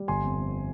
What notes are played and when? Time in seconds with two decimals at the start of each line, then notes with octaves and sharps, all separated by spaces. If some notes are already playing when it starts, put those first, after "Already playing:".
Already playing: G3
0.08 G1 G#5 C6
0.23 F2
0.38 F2